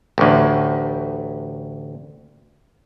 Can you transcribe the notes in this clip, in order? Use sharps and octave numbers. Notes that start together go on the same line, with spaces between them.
A1 D2